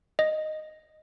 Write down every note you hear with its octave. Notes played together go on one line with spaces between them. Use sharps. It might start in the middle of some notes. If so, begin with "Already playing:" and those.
D#5